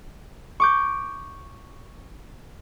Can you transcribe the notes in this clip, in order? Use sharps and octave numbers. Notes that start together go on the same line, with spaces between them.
C#6 D6 G6